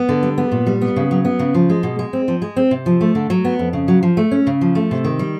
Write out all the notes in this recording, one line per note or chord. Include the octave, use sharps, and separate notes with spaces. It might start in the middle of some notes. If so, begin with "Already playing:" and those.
Already playing: B3
D3
G3
B3
A#2
G3
B3
C#3
F#3
B3
C#3
F3
G#3
B2
G#3
C4
F3
G#3
C4
C3
F3
A3
D3
F#3
B3
F2
C#3
F#3
F3
A3
C#4
C#3
F3
A3
C3
D#3
G3